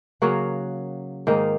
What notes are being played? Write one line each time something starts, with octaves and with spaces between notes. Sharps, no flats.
C#3 F#3 A#3 F#4
G#2 D#3 A#3 D#4